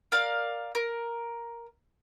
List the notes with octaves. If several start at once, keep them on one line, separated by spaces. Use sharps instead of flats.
A#4 D5 F5
A#4